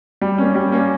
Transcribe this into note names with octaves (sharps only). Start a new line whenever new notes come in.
G3
A#3 C#4
G3
A#3 C#4